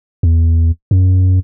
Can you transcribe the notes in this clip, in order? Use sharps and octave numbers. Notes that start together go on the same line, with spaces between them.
E2
F#2